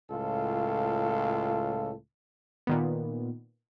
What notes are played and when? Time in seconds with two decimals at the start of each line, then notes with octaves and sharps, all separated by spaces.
0.10 C#2 A2 F4 A4
2.67 A#2 D#3 B3